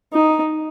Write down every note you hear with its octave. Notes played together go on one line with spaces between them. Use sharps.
D#4